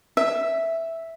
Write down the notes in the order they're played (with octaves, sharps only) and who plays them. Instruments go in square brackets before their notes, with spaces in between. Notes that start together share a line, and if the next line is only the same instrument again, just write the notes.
[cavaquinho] E5